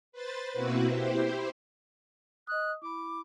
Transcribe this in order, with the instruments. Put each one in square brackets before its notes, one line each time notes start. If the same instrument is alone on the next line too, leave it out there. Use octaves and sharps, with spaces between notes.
[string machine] B4 C5 A6
B2 A#3 C4 E4 F#4 B4
E4 G4 C5
[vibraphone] D#5 D#6 [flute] F#6
[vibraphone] E4 B5 [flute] D6